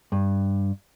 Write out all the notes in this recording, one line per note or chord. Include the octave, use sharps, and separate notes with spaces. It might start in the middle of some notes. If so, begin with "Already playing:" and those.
G2